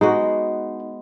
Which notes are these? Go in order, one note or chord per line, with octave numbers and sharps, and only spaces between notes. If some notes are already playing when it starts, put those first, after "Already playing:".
G#3 B3 D#4 F#4